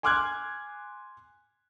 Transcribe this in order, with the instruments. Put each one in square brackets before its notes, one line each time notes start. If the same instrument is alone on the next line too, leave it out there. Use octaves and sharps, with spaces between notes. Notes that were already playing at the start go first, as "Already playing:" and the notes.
[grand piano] G#5 C6 D6 F6 F#6 G#6